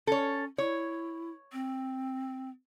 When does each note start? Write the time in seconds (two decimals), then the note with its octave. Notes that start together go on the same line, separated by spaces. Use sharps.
0.07 C#4 A4 C#5
0.58 E4 C#5
1.52 C4